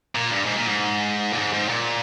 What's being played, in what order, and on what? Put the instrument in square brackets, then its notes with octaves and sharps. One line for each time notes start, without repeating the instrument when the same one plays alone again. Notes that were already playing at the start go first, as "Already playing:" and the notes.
[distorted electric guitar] A#2
G2
G#2
A#2
G#2
A#2
G#2
G#2
A#2